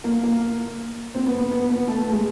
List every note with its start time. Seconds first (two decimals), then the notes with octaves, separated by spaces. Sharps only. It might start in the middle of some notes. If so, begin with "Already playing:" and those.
0.04 A#3
0.23 A#3
1.15 C4
1.26 B3
1.38 B3
1.51 B3
1.70 B3
1.88 A3
2.00 A3
2.12 G#3